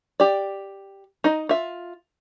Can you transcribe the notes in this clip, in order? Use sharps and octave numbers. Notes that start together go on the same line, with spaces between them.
G4 D5
D#4 D#5
F4 E5